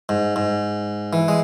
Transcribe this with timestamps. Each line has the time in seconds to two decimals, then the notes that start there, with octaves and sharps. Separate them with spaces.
0.09 G#2
0.36 G#2
1.13 E3
1.28 G#3